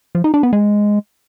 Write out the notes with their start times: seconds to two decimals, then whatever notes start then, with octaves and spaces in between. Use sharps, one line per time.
0.15 F3
0.24 D#4
0.34 D4
0.43 B3
0.53 G#3